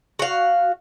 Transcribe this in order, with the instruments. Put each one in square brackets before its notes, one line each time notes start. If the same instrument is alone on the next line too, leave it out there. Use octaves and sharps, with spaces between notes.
[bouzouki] F#4 F5